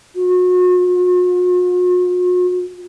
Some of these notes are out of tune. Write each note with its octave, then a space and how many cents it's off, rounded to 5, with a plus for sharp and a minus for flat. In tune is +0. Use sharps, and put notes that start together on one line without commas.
F#4 -45